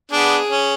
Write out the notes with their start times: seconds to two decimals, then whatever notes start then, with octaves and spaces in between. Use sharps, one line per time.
0.12 B3 D4 G#4
0.49 C#4